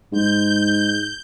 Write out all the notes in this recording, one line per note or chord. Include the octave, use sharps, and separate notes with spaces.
G#2 G6